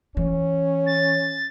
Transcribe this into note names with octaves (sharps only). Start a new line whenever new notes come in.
E3 C#4
A6